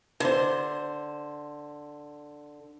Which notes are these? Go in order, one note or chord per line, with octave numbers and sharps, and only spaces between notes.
D3 C5